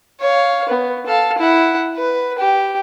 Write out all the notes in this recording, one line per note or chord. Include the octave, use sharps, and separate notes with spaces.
C#5 F5
B3
A4 F5
E4 F#5
B4
G4